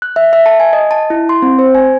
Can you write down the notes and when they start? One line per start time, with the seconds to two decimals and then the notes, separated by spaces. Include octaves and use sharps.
0.02 F#6
0.16 E5
0.33 E5
0.46 A5
0.60 G#5
0.73 D#5
0.91 A5
1.10 E4
1.29 C6
1.42 C4
1.59 C5
1.75 G#5